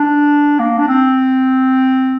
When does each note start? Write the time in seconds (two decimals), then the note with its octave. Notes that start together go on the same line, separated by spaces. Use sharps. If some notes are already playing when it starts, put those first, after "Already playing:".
Already playing: D4
0.59 A#3
0.79 D4
0.89 C4